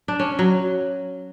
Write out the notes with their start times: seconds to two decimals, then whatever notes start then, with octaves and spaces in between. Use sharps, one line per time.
0.08 D4
0.20 C#4
0.39 F#3